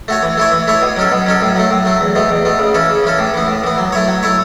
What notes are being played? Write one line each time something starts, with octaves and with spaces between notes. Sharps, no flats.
A3 F#4 C#5
E3
A3 E4 C#5
E3
A3 E4 C#5
B2
F#3 C#4 A4
B2
F#3 C#4 A4
A2
F#3 A3
A2
F#3 A3
E2
B2 A3
E2
B2 A3
C#3
E3 C#4 A4
C#3
E3 C#4 A4
A2
E3 B3
A2
E3 B3
F#3
A3 E4 C#5
F#3
A3 E4 C#5